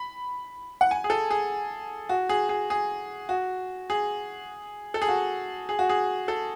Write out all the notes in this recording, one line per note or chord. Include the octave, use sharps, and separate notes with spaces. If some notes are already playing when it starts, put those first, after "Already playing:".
Already playing: B5
F#5
G#5
G#4
A4
G#4
F#4
G#4
G#4
G#4
F#4
G#4
A4
G#4
F#4
G#4
F#4
G#4
A4